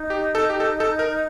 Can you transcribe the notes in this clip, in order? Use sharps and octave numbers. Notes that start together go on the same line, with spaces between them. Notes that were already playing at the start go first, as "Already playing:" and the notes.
Already playing: D#4
G4
A4
G4
A4
A4
A#4